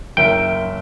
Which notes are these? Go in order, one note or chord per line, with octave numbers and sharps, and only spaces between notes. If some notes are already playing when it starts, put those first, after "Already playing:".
F#1 A#4 E5 G5